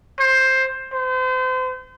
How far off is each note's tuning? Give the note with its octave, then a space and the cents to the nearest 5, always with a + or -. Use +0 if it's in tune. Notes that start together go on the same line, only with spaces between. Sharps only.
C5 +10
C5 -35